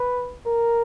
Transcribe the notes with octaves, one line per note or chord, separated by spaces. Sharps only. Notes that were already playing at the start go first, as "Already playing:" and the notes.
Already playing: B4
A#4